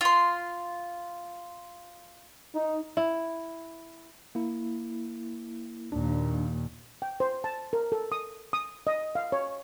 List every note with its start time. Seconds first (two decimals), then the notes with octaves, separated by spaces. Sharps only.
0.01 F4 C6
2.54 D#4
2.97 E4
4.35 A#3 E4
5.92 D#2 A#2 D4
7.02 G5
7.20 C5
7.44 A5
7.73 A#4
7.92 A4
8.12 D#6
8.53 D#6
8.87 D#5
9.15 F5
9.32 C#5